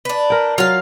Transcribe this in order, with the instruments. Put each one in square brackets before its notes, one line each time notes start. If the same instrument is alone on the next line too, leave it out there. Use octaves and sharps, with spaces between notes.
[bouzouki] D4 B4
[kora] A#4 G5
[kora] F#3 [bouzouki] F4 F5